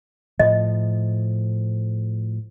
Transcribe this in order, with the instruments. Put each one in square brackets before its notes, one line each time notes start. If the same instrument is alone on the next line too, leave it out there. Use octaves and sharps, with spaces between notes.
[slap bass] A2 F3 [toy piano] D#5